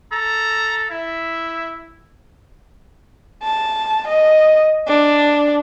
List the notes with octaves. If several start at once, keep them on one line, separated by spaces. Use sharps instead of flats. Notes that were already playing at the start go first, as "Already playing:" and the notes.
A4 A#5
E4 E5
A5
D#5
D4